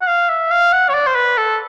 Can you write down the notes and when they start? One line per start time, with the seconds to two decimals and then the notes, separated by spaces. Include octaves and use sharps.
0.02 F#5
0.07 F5
0.29 E5
0.51 F5
0.72 F#5
0.89 C#5
0.94 D5
1.07 C5
1.15 B4
1.37 A4